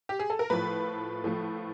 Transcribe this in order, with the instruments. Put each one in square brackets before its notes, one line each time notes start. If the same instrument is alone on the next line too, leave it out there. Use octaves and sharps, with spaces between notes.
[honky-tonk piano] G4
G#4
A4
A#4
A2 F3 A3 B4
A2 F3 A3